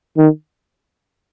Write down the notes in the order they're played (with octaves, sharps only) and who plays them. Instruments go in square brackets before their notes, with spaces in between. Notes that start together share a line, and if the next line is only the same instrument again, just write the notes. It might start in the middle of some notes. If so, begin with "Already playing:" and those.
[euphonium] D#3